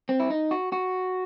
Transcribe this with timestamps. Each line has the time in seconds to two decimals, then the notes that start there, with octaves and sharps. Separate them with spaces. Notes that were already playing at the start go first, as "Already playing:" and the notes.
0.09 C4
0.20 E4
0.30 D#4
0.51 F#4
0.72 F#4